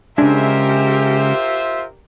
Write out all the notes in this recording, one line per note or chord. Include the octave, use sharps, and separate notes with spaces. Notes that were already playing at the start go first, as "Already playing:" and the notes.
C#3 G#3 D4 F4 G4 A#4 C5 E5